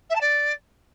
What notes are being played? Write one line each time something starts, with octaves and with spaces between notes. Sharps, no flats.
E5
A5
D5